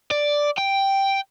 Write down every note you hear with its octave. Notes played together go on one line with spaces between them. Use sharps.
D5
G5